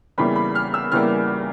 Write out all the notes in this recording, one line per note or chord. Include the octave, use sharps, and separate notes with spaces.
E2 C#3 E3 G3 A#3 B5
B5
F6
E6
E2 C#3 E3 G3 A#3 F6